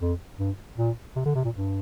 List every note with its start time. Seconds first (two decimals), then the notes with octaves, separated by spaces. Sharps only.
0.01 F2
0.39 G2
0.78 A#2
1.16 C3
1.25 D3
1.35 C3
1.44 A#2
1.55 G2